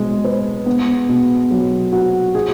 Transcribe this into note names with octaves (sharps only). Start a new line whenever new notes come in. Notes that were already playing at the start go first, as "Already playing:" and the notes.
Already playing: B2 G#3
B4
B3
B2
F#3
F#4
G#4